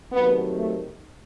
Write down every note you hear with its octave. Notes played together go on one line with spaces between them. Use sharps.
C3 D#3 F#3 A3 B3
A3